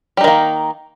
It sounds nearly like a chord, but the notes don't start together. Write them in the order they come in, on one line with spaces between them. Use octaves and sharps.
G3 D#4 D#3 A#3